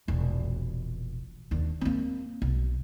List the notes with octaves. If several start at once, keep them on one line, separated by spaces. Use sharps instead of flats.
E1 A#1
D#2 D4
A#3 C4
B1